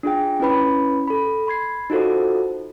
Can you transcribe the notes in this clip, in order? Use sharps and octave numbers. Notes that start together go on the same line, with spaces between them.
D4 F4 G#4 G5
C#4 E4 B4 B5
A4 B5
B5 C6 G#6 C7
D#4 F4 F#4 A4 C5